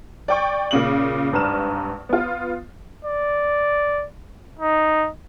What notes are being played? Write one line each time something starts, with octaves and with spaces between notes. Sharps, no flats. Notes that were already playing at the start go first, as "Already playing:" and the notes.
D5 G5 C#6
A#2 C#3 F#7
G#1 G2 B4 A#5 F6 E7
B3 F4
D5
D#4